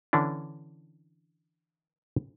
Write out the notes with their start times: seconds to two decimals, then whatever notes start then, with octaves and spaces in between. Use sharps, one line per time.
0.13 D3 E3 C#4 D4